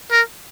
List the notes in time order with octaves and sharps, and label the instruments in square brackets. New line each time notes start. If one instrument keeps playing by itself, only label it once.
[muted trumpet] A#4